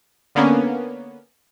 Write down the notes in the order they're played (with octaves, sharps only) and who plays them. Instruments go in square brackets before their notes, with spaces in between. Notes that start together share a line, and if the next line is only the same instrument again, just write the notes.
[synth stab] D3 A#3 B3 C#4